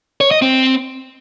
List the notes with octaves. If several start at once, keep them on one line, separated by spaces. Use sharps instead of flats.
C#5
D#5
C4